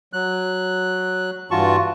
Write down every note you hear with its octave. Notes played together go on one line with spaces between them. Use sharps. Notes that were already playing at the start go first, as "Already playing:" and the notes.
F#3 F#6
G2 E3 F4 F#4 A5 C#6